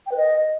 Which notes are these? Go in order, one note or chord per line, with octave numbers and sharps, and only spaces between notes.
G5
B4
D#5